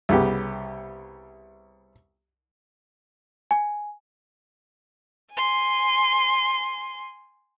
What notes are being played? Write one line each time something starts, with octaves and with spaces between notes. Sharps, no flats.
C2 C#3 B3 G4
G#5
G#5 C6